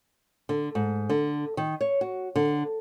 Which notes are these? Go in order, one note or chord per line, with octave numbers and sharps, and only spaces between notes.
D3
G#2
D3
D#3
C#5
F#4
D3